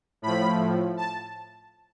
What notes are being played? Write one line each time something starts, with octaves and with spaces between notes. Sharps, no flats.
A2 F3 B5
A5